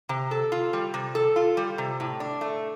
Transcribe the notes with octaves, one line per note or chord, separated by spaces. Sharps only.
C3
A4
F4
G3
C3
A4
F4
G3
C3
A2
D4
A3